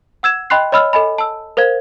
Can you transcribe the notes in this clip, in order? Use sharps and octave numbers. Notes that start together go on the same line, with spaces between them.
F#5 E6 G#6 E7
D#5 G5 B5 C6 F#6 C7
C#5 D#5 B5 E6 F6
A4 D#5 G#5 B5
A5 E6
A#4 C5 F5 G#6